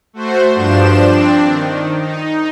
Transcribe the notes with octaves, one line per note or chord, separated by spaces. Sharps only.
A3 F#4 C5
G2 F3 D4 C5 E7
C4 D4
D#3
D#4